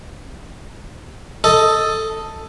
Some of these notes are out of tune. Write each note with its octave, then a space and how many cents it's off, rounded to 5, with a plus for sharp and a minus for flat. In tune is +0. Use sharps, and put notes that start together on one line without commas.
A4 +5 D#5 +5